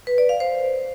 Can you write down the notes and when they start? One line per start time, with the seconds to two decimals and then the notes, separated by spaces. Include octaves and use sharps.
0.07 B4
0.18 D5
0.29 F5
0.40 C5